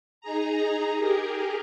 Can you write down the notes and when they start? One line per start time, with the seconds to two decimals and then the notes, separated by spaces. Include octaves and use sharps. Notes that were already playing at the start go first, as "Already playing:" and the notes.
0.21 D#4 G#4 A#5
0.97 G4 G#4 A#4